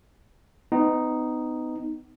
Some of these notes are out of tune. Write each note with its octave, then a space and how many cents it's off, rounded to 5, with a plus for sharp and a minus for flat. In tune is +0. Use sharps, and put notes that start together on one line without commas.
B3 +35 D#4 +0